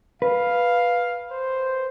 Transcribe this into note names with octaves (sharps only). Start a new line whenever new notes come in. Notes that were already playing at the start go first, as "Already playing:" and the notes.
B4 F5
C5